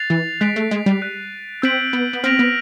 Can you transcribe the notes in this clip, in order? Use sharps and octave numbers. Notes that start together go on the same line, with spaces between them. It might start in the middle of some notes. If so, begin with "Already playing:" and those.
Already playing: F#6 A6 C7 F7
E3
G#3 F#6 B6 D7 F7
A3
G#3
G3
F#6 B6 D#7
C4 E6 G6 B6 D7 F#7
B3
B3
C4 F6 A#6 D7 F7
B3